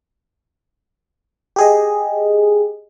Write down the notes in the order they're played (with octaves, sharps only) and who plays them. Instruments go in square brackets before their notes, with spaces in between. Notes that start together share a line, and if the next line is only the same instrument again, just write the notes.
[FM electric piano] G4 G#4 D#5